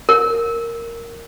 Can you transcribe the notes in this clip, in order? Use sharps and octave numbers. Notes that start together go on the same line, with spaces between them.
A#4